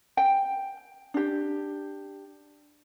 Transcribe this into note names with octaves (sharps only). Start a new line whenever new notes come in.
G5
D4 G4